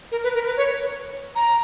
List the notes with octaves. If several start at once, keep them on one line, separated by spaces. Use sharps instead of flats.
A#4
B4
A#4
B4
C#5
A#5